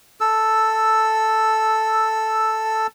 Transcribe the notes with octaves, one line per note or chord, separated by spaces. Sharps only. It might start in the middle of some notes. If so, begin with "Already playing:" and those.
A4 E6